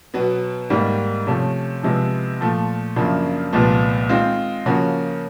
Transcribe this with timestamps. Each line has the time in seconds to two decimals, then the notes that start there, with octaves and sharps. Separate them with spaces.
0.14 B2 F#3 B3
0.70 G#2 D#3 G3 A#3
1.27 C3 F3 A3 C#4
1.83 C3 F3 G#3 B3 E4
2.40 A#2 F3 A3
2.96 F#2 C#3 F3 A#3 D4
3.53 C2 A#2 F3 G#3 B3
4.09 D#3 G#3 C4 F4
4.66 C#3 F3 A#3 C#4 F#4